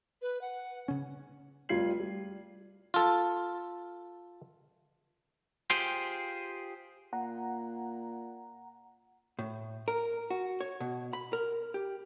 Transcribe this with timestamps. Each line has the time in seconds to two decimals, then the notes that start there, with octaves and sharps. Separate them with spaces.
0.22 B4
0.41 F#5
0.88 C#3 C#4
1.69 F1 G3 F4 G#6 C7 F#7
2.00 G3
2.94 F4 A4
5.70 F4 G4 G#4 C5 G5
7.13 A#2 F#5 A#5
9.39 A2
9.88 A#4
10.30 F#4
10.61 C#5
10.80 B2
11.13 B5
11.33 A#4
11.74 G4